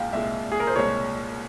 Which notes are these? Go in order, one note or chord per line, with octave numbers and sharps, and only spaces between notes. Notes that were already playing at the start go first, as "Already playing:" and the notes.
Already playing: C2 A#2 G#3 F5 G5
C2 A#2 G#3 E5
G#4
A#4
C5
C2 A#2 G#3 C#5